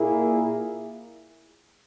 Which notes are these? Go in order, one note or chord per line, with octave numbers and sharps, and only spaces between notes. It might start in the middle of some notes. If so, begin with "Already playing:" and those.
Already playing: A#2 A#3 E4 G#4